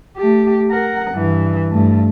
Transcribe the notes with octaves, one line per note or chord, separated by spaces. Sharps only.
A3 G4
A#4 F#5
G2 E3
G2 A3